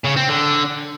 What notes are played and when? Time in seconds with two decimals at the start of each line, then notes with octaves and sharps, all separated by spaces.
0.05 C#3
0.17 C4
0.29 D3